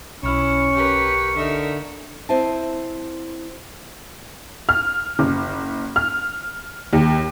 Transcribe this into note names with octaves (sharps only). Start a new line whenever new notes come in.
B1 C#4 E4 C#6 F6
G4 A#4 B4
D3 D#4 A#4 E5
C4 E4 D#5 A5
F6
F#1
F6
D#2